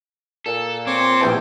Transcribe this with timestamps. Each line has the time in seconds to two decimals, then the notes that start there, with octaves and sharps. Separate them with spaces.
0.46 A#2 A4
0.87 C4 C#5 C6 D6
1.21 A#1 E2 C3 E3 G5 A5